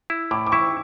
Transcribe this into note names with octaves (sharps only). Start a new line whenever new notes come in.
E4
A2 D6
D6
E4 C#6